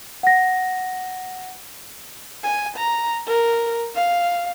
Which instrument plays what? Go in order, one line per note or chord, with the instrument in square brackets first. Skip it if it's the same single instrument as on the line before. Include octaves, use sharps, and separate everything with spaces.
[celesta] F#5 A#6
[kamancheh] G#5
A#5
A#4
F5